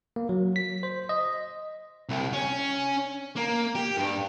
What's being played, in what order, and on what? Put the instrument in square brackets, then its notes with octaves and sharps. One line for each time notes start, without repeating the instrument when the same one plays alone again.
[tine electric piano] A#3
F#3
B6
C5
D#5
[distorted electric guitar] C2
C#4
A#3
G4
G2